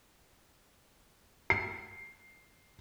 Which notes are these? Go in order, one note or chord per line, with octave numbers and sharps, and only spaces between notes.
C7